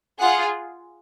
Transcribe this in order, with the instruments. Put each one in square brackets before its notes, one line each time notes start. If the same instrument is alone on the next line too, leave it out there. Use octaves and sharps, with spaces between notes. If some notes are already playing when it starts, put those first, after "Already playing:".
[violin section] F4 G#4 F#5